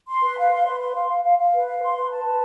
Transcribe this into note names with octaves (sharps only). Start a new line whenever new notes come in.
C6
B4
F5
C6
B4
C6
F5
F5
F5
F5
B4
F5
C6
B4
A5
B4